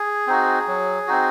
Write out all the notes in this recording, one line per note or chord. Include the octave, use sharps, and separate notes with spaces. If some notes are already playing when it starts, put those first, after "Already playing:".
Already playing: G#4
C4 D#4 F#4
F#3
C4 D#4 F#4